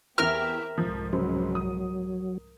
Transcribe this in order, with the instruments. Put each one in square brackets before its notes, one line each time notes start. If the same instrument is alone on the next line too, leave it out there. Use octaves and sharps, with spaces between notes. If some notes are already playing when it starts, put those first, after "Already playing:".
[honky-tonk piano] E2 E3 E4 [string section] C4 G4 E5 [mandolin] A#4 F6
[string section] C2 F2 G#2 [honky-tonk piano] F3
[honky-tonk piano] C#2 C#3 C5 [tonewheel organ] F#3
[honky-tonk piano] D#6